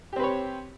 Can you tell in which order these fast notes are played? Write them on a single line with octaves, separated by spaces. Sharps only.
G4 C4 B4 C#5